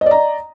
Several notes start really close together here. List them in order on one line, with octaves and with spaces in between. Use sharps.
D#5 D5 A#5